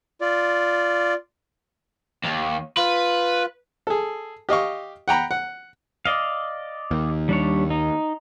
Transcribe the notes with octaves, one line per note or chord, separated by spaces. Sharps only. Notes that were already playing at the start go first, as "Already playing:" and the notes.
F4 D5
D#2
F4 B4
G#4 A4
G4 D#5 F5 C#6
F#5 G5 A#5 B5
F#5
D5 D#5 F5
D#2
G3 D4 C#5
D#4